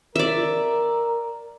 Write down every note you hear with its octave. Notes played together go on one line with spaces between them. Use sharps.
A#4 D5 E5